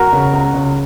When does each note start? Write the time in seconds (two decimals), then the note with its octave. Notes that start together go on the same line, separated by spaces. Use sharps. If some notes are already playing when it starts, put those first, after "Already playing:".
Already playing: E1 F#4 A#4
0.13 C#3
0.33 C#2
0.54 C#3